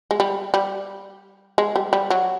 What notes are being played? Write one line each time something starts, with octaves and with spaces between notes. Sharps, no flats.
G#3
G3
G3
G#3
G3
G3
F#3